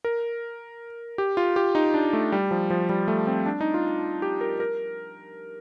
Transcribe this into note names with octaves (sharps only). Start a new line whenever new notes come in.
A#4
G4
F4
G4
D#4
D4
A3
G3
F3
F3
G3
A3
C4
D4
D#4
F4
G4
A#4
A#4